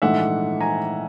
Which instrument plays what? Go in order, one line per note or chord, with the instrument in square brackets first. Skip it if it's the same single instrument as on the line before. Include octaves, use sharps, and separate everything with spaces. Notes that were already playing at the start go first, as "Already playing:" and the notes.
[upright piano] A#1 G#2 E3 A3 E5 F#5
G#5 A#5